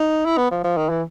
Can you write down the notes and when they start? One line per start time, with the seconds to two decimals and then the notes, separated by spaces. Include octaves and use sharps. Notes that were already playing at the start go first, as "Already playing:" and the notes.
Already playing: D#4
0.25 E4
0.37 B3
0.51 F3
0.64 F3
0.77 D#3
0.90 E3